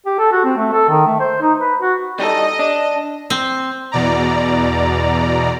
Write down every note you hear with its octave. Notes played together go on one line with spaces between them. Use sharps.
G4
A4
F#4
C4
A3
A4
D#3
A3
C5
D#4
B4
F#4
G3 D#4 A4 D#5
D4
C4
E2 B2 D5 A#5